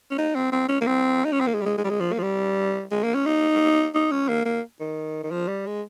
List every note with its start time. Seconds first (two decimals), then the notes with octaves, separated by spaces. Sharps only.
0.11 C#4
0.18 D#4
0.35 C4
0.52 C4
0.68 C#4
0.81 A#3
0.87 C4
1.25 D#4
1.32 C#4
1.40 C4
1.47 A#3
1.54 G#3
1.61 G3
1.65 G#3
1.78 G#3
1.84 G3
1.89 G#3
2.00 F3
2.12 A#3
2.19 F3
2.23 G3
2.91 G#3
3.03 A#3
3.14 C#4
3.26 D#4
3.95 D#4
4.11 C#4
4.28 A#3
4.45 A#3
4.80 D#3
5.23 D#3
5.31 F3
5.48 G3
5.66 G#3